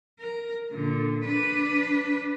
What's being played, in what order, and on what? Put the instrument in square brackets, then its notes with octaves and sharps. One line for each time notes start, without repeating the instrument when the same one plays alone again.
[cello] A#4
A#2 D3
D4 B4